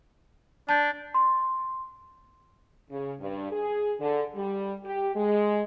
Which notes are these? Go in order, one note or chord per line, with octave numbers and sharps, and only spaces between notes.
D4 A5 G6
C6
C#3
G2
G#4
D3
G3
G4
G#3